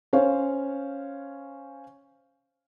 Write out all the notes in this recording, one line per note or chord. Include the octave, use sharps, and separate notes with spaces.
C#4 C5 C#5 F5